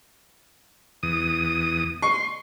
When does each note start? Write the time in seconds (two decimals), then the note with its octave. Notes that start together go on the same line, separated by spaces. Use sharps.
1.03 E2 D#6
2.02 C6 C#6